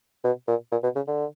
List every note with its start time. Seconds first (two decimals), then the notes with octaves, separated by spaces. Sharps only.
0.24 B2
0.48 A#2
0.72 A#2
0.83 B2
0.95 C#3
1.07 D3